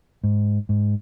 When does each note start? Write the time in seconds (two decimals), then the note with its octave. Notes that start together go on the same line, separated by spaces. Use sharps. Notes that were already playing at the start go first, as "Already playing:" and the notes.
0.24 G#2
0.69 G#2